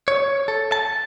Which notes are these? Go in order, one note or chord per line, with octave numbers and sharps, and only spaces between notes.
C#5
A4
A5